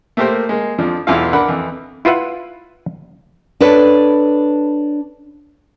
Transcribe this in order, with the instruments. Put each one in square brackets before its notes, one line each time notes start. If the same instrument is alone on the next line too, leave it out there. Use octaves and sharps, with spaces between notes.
[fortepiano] A3 A#3 G4 A#4 C5
G#3 A#3
F2 F3 D4
B1 E2 B3 E4 F4 F5
D4 A#4 F#5 B5
F2 E3
[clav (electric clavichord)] E4 F4 B4 E5 F#5
[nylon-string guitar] D4 A4 B4 C#5 D5